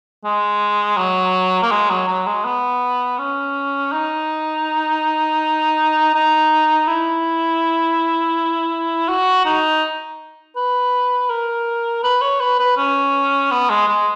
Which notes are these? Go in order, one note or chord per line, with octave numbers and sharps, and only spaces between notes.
G#3
F#3
A#3
G#3
F#3
F#3
G#3
B3
C#4
D#4
D#4
E4
F#4
D#4
B4
A#4
B4
C#5
B4
B4
C#4
B3
G#3
G#3